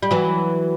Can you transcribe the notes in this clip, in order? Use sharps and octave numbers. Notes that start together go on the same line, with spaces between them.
G3
E3 F#3